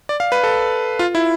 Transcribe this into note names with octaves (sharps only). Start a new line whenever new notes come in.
D5
F5
B4
A4
F4
E4